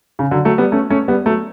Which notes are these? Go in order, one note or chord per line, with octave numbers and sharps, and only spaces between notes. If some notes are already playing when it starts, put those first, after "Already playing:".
C#3
D3 F#3
F#3 A3
G3 B3
A3 C#4
A3 C#4
G3 B3
F#3 A3